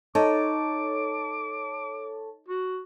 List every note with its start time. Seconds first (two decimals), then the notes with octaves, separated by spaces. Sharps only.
0.15 D#4 A4 C#5 A5 D6
2.48 F#4